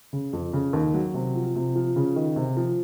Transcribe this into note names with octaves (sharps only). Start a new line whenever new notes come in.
C#3
F2
C#3
D#2
F#3
C3
F3
C3
F3
C#3
D#3
C3
F3